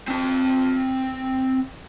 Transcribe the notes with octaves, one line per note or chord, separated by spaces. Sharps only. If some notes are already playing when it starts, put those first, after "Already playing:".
C4 A5